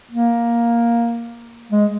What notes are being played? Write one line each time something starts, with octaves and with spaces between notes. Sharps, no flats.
A#3
G#3